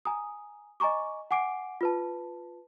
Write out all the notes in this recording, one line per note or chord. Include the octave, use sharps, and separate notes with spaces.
G#5 A#5 D#6
D#5 G#5 A#5 C#6 D6
F#5 G#5 D6 C7 D7
F4 B4 A5